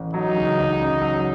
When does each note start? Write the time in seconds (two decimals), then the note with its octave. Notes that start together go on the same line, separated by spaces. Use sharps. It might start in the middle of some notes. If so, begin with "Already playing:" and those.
Already playing: A1
0.14 F#3 D#4
0.36 C#2
0.58 C#2
0.79 C#3
1.01 F#3